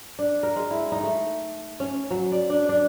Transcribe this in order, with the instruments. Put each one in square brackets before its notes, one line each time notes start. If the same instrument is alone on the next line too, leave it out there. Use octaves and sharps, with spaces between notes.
[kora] D4
A#4
G#3
E4
D#4
A3
C#4
F#3
D5
D4
D4